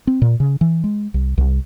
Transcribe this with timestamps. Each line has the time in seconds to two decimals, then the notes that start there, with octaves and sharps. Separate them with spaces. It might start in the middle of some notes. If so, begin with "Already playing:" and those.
0.07 C4
0.22 A#2
0.40 C#3
0.61 E3
0.84 G#3
1.14 C2
1.38 C2